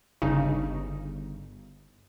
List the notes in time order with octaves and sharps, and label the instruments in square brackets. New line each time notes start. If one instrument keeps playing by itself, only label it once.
[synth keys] G1 [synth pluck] G2 C#3 [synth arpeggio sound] D#4